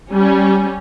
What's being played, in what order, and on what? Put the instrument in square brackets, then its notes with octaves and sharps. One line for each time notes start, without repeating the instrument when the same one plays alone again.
[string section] G3 C#4